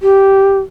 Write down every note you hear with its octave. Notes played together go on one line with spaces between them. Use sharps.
G4